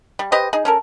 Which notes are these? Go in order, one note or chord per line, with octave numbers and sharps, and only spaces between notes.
G3
G4 B4 C5 D#5
D#4 G#4
C#4 A4 A#4